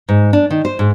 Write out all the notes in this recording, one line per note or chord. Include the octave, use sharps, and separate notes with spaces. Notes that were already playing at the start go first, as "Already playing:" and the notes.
G#2
D4
D#3
C5
G#2